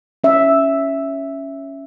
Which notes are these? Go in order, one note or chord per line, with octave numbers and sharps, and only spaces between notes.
C#4 E5